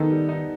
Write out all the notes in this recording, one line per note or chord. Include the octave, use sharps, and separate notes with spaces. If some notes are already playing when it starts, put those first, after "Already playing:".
Already playing: D#3 B3 D#4 A4
G3
D#4